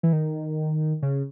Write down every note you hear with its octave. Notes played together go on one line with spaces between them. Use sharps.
E3
D#3
C#3